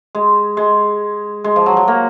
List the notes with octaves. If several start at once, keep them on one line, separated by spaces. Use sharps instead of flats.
G#3
G#3
G#3
F3
F#3
F#3
A#3